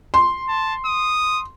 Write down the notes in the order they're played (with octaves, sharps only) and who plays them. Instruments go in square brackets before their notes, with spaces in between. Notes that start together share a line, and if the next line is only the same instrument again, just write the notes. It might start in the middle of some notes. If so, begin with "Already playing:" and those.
[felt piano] C6
[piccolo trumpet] A5
D#6